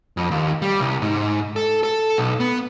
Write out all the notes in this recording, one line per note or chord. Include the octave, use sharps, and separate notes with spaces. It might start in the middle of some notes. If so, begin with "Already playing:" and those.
F2
D#2
G3
C2
G#2
A4
A4
B1
B3